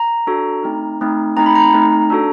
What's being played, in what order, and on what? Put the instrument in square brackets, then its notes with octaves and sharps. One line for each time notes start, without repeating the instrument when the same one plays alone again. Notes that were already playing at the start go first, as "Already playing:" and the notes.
Already playing: [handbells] A#5
D4 F#4 A4
A3 C4 D#4
A3 C4 D#4
A3 C4 D#4 A#5
B5
A#5
A3 C4 D#4
D4 F#4 A4